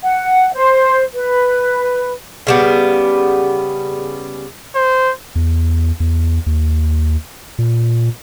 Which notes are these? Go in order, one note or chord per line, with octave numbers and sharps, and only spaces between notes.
F#5
C5
B4
C#3 G3 B3
C5
E2
E2
D#2
A#2